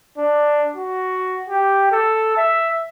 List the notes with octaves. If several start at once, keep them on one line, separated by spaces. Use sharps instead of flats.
D4
F#4
G4
A4
E5